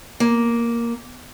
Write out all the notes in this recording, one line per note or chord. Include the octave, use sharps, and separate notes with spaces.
A#3